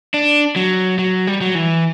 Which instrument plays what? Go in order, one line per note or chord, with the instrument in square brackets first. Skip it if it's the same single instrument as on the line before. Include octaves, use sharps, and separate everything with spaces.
[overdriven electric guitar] D4
F#3
F#3
G3
F#3
E3